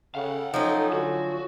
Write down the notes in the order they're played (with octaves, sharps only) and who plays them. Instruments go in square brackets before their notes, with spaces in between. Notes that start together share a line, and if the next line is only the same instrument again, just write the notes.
[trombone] C#3 [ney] A4 [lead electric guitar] F5 F#5
[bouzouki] F3 F#3 C#4 [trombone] D#4
[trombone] D3 [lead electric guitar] F#4